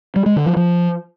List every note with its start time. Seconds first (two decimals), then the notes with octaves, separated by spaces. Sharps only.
0.16 G3
0.26 G#3
0.36 D3
0.46 F3
0.56 F3